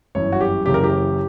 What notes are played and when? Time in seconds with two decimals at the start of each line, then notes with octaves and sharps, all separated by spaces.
0.15 G1 F#2 E3 C#5
0.32 F#4
0.41 G4
0.66 F#1 F#2 C#3 E3 G4
0.74 A#4
0.84 G4